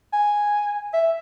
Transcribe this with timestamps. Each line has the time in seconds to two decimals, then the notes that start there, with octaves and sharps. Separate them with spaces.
0.13 G#5
0.93 E5